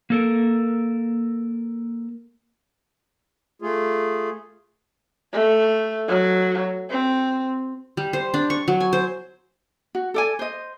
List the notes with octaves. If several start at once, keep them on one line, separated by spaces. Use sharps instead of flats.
A#3 A4 A#4
A3 F4 G#4
A3
F#3
C4
G3
C5
D4
C#6
F#3
G#5
C5
F#4
A4 D5 G#5
C5 D#5